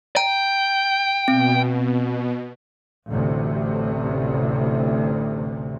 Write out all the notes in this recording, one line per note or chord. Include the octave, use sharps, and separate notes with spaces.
G5 A#5
B2 C4
A1 D2 C3